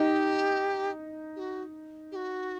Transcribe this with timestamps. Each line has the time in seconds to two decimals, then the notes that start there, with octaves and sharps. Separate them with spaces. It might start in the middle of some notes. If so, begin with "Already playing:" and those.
Already playing: D#4 G4
1.36 G4
1.40 F#4
2.12 G4
2.16 F#4